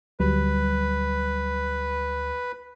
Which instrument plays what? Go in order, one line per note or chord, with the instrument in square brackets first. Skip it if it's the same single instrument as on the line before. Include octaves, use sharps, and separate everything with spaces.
[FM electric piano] D2 F#3 G3 [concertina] B4